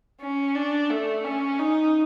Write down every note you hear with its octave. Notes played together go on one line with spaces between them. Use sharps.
C#4
D4
A3
C#4
D#4